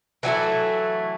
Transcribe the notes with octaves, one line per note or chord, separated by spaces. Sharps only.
E3 F#3 A3 E4